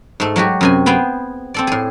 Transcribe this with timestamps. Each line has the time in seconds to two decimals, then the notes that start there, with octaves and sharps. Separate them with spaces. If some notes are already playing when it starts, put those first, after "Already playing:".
0.20 G#2 A3
0.36 F#3 G#3 F#4 G4
0.61 F#2 C3 G#5
0.86 B3 C4 G#4 G5
1.54 C4 A4 D5
1.67 A2 G#4